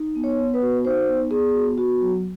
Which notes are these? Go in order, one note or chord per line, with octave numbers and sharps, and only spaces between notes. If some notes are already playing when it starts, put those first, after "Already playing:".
Already playing: D#4
B3
C#5
B3
B4
F#4
D#4 C5
B3
B3 G#4
F#4
B3 F#4
F#3